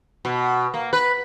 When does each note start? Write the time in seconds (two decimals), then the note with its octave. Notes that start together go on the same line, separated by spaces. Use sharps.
0.25 B2
0.74 A#3
0.93 B4